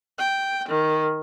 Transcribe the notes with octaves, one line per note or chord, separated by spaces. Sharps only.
G5
D#3